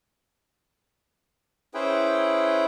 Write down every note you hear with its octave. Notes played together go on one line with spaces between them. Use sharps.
C#4 E4 G#4 B4 C5 G5